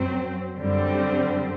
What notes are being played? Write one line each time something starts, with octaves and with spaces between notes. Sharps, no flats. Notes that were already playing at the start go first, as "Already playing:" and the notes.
Already playing: F#2 F#3 C4
F#2 D3 G3 C4